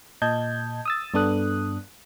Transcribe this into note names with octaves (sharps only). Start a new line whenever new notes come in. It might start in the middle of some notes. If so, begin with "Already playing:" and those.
A#2 D#5 A5 G6 G#6
D#6 E6 A6
G2 B3 D4 A4 D#6 F#6